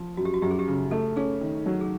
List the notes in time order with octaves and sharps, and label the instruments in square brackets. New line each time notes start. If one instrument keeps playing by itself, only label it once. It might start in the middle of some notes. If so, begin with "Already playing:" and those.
Already playing: [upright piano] F3
[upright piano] F#2 [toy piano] F#4
[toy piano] G4
F#4
[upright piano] F#2 [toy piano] G4
[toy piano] G#4
G4
[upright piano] C#3
[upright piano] A3 [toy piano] A4
[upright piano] C#4 [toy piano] G#4
[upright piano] D#3
F#3
[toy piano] G#4